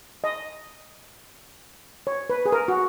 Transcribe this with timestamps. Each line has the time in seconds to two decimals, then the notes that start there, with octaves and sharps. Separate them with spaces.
0.24 D#5
2.07 C#5
2.30 B4
2.46 G#4
2.52 A#4
2.68 F#4